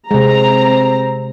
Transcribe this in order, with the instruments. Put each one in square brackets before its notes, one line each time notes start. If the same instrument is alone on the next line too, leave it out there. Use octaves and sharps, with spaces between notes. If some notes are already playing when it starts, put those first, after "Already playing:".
[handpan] C3 G#3 [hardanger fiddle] C4 [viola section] A#5